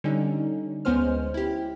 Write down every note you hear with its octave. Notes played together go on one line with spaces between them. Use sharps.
D3 G3 C#4 D#4
D2 G#3 B3 C#4 C5 F6
E4 G4